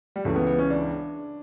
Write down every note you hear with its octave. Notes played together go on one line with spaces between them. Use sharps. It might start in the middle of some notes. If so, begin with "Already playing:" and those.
G3
C#2 C#3 E3 A3
B3
B3
C#4
D4